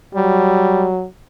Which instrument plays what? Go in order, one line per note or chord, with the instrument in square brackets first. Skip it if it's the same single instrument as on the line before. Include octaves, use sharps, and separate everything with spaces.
[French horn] F#3 [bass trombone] G3